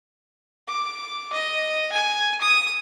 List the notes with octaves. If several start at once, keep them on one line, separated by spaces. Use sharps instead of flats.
D6
D#5
G#5
D#6